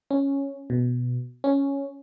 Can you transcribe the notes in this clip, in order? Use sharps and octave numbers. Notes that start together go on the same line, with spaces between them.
C#4
B2
C#4